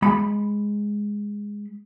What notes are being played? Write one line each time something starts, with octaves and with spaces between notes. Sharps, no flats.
G#3 B5